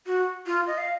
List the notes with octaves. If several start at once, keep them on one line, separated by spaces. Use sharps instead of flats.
F#4
F4
D#5
F5